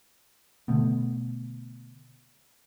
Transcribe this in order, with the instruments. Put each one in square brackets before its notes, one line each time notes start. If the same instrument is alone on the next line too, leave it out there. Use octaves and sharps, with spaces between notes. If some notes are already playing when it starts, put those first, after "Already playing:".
[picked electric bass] B2 D3 A3 B3